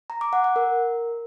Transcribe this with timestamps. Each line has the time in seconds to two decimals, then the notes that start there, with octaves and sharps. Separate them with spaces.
0.10 A#5
0.21 D6
0.33 F#5
0.44 F#5
0.56 A#4